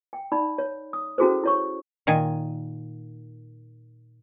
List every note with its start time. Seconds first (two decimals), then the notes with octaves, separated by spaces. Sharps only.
0.13 G5
0.32 D#4 D5 B5
0.58 C#5
0.93 D#6
1.18 C#4 E4 F#4 G#4 A4 C5
1.44 E4 C#5 C#6
2.07 A#2 D#3 G#5